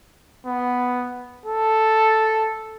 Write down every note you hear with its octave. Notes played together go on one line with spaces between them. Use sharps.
B3
A4